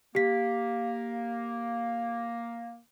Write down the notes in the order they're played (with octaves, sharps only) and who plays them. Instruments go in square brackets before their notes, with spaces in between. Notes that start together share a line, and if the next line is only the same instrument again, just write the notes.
[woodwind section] A#3 [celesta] G4 B6